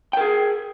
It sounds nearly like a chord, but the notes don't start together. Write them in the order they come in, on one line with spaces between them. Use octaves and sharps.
G5 A#4 G#4